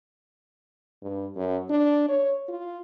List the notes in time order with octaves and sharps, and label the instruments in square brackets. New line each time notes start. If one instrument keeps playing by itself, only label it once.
[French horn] G2
F#2
D4
C#5
F4